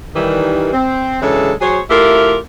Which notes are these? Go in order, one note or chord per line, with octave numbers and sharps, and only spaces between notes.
D#3 E3 G3
C4
C#3 E3 F#3 G#3 D4 A4
F#3 G#4 C5 C#5
A3 E4 F4 G4 A#4